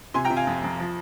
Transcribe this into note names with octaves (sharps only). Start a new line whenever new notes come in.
C3 G#5 C6
G5 A#5
C3
F5 G#5
F2
F2
F3